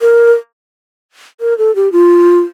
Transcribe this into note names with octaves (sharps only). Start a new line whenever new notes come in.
A#4
A#4
A4
G4
F4